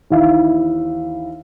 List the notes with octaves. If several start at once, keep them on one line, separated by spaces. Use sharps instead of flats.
D#2 E3 E4 E5 F5